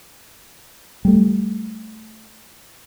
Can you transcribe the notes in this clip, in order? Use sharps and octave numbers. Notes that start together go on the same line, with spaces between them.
G3 A3